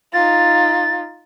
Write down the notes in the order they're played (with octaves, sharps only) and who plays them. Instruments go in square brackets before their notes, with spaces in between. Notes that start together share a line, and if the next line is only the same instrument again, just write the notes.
[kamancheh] D#4 F4 [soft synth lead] A6